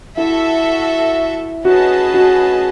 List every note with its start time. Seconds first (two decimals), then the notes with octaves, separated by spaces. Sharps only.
0.17 E4 F#4 A4 E5
1.65 C#4 F#4 G#4 B4 D#5 A5
2.14 F#4